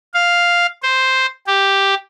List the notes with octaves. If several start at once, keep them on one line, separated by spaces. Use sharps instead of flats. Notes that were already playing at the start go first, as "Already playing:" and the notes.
F5
C5
G4